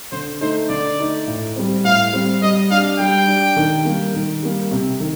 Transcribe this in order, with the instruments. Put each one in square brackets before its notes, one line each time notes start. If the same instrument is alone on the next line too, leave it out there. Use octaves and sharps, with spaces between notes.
[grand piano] D3 [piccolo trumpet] C5
[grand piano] A3 D#4 A4 [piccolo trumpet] C5
[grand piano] D3 [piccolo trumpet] D5
[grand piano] A3 D#4 A4
A2
G3 C4
[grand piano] A2 [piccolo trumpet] F5
[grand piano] G3 C4
[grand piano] G3 [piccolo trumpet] D#5
[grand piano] D4 G4 [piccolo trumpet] F5
[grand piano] G3 [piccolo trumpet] G5
[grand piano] D4 G4
D#3
G3 A#3
D#3
G3 A#3
C3
D#3